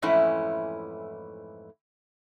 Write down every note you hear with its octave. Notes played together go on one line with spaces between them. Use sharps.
F2 G#2 E3 A3 C#4 E4